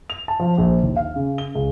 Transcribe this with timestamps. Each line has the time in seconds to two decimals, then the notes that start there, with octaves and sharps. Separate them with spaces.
0.10 F7
0.28 A5
0.40 F3
0.58 A#1
0.83 D#2
0.96 F5
1.16 C#3
1.38 G7
1.55 C#2